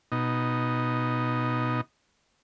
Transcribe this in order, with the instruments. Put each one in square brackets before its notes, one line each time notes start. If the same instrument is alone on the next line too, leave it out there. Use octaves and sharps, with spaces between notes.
[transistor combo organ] B2 D#4